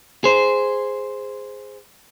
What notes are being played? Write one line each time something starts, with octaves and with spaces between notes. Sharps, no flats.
G#4 C5